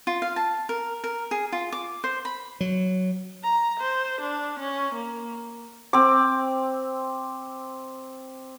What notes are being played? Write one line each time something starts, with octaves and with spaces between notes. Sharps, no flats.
F4
F5
A5
A#4
A#4
G#4
F4
D6
C5
B5
F#3
A#5
C5
D4
C#4
A#3
C4 D6